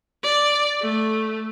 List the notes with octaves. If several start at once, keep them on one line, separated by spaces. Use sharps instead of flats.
D5
A3